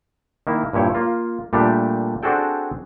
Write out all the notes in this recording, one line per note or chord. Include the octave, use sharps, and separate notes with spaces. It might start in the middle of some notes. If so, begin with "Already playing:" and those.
D#3 A#3 E4
G2 A#2 E4 C#5 G5
A#3 F4
A#2 G3 A3 D4 G4
C4 D4 F#4 G#4 A4 G5